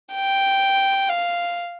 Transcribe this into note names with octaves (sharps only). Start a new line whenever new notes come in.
G5
F5